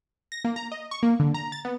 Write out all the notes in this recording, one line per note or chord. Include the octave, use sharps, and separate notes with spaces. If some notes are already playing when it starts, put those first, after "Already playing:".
A#6
A#3
A#5
D#5
C#6
A#3
D3
A#5
A6
B3